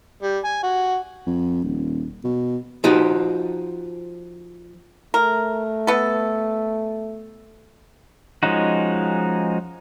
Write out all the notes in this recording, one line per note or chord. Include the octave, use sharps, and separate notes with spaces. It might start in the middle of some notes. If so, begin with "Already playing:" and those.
G3
G#5
F#4
F2
D#1
B2
F3 D#4 F#4 G4
A3 A#4
B3 A4
F3 G#3 C#4 D#4 F#4